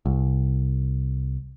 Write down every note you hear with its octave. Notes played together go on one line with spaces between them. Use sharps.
C2